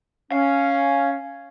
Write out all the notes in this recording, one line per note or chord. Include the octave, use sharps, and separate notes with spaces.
C#4 F5